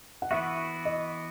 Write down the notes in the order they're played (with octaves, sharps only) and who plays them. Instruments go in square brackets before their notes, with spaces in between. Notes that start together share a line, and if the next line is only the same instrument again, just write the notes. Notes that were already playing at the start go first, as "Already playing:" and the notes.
[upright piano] F#5
[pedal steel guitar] E3 B3 F#4 [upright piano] E5
[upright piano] D#5